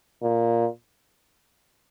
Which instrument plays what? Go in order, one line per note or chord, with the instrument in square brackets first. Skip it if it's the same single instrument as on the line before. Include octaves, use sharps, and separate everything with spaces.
[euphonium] A#2